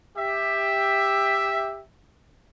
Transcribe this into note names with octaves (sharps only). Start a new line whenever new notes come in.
G4 E5